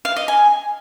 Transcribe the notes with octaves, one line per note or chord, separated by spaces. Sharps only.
F5
D#5
G#5